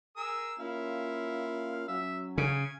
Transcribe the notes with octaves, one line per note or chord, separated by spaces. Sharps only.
G#4 A#4 E6
A#3 C#4 E4 F4 F5
F#3 C#4 E5
C#3 G#5